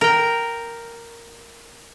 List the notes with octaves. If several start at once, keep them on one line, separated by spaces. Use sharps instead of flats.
A#4 G5